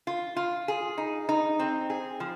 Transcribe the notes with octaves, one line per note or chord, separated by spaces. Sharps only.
F4
F4
G#4
D#4
D#4
C4
G#4
F3